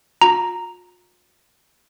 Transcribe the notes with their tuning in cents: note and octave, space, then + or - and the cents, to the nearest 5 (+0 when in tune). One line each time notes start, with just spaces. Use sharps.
F4 +45 A#5 +0